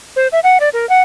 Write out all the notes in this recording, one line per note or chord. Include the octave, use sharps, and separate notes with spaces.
C5
E5
F#5
D5
A#4
F#5